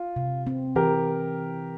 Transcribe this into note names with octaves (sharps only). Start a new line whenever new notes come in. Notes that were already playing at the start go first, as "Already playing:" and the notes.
Already playing: F4
C3
C4
E3 G4 A#4